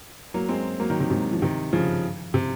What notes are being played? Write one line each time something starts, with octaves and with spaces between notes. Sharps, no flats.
F#3 A#3
G#3 C4
F#3 A#3
D#3 F#3
C3 D#3
G#2 C3
F3
C3 D#3
C#3 F3
C3